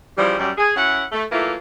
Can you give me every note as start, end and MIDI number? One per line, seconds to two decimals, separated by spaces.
0.17 0.38 49
0.17 0.38 52
0.17 0.38 53
0.17 0.38 55
0.39 0.50 42
0.39 0.50 55
0.58 0.72 68
0.76 1.03 42
0.76 1.03 61
0.76 1.03 64
0.76 1.03 78
1.12 1.24 57
1.32 1.55 52
1.32 1.55 54
1.32 1.55 57
1.32 1.55 58
1.32 1.55 64
1.32 1.55 65